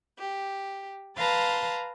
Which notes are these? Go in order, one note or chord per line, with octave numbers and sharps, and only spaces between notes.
G4
B4 F5 A5 A#5 C6